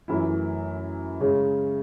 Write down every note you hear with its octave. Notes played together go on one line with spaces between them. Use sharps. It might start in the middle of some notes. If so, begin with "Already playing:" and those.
F#2 E3 A3 E4
C#3 G#3 C#4